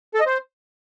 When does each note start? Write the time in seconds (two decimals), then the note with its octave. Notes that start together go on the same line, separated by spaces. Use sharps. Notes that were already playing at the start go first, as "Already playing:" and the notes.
0.14 A4
0.20 D#5
0.26 C5